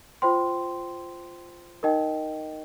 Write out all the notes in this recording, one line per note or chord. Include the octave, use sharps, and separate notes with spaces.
F4 C5 G5 C6
D#4 A#4 D#5 G5